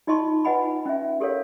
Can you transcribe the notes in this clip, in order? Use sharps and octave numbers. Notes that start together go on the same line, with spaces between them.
D#4 F4 D#5 A5 C6 C#6
F4 B4 D#5 F#5 G#5 B5
C#4 E5
G4 A4 A#4 C#5 F5